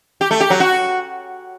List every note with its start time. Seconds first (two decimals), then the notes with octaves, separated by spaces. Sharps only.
0.21 G4
0.31 A3
0.40 G4
0.50 F#3
0.60 F#4